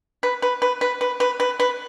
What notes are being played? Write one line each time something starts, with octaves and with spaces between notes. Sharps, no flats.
B4
B4
B4
B4
B4
B4
B4
B4